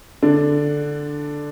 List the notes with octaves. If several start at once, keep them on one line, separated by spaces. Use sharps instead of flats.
D3 D4